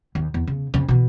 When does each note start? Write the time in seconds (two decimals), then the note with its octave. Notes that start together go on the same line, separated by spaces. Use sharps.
0.15 D#2
0.34 E2
0.47 C#3
0.74 F2 C#3
0.88 B2 E3